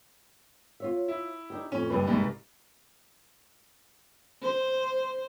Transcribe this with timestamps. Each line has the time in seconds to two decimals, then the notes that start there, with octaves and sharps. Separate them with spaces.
0.80 F4 C#5 E5
1.08 E4
1.50 D4 D#4 G4
1.72 F2 A2 C#4
1.90 F#1 G2 B4
2.07 C2 G#2
4.42 C5